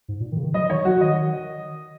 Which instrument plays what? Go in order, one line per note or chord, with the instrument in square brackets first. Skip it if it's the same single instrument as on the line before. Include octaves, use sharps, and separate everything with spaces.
[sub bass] G#2
A#2
D#3
C#3
D#3
[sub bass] F#3 [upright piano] D#5
[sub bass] D#3 [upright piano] C#5
[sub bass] F#3 [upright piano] F#4
[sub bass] D#3 [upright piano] D#5